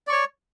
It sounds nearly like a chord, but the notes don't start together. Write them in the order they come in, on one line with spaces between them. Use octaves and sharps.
D5 C#6 C#5